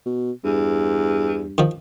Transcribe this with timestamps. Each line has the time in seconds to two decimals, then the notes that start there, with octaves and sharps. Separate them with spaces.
0.06 B2
0.44 E2 G2
1.58 D#3 F3